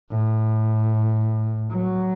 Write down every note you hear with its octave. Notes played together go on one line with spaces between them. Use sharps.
A2
F#3